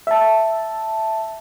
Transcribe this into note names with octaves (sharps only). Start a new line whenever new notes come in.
E5 A5